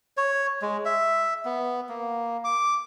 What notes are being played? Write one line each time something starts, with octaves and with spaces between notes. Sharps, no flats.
C#5
G#3
E5
B3
A#3
D6